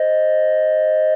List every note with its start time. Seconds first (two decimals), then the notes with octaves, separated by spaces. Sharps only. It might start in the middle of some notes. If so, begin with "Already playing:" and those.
Already playing: C5 D#5